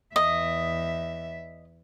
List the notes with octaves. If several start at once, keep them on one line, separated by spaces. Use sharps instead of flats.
E2 D#5 E5